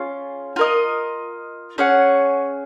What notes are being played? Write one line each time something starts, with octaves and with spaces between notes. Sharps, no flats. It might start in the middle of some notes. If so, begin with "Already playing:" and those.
Already playing: C#4 F4 G#4
F4 A#4 D#5
C#4 G#4 C#5 F#5